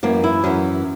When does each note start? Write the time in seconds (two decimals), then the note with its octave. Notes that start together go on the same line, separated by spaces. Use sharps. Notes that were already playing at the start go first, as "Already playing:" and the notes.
0.03 F#2 E3 A#3
0.24 E4
0.44 F#2 E3 C#4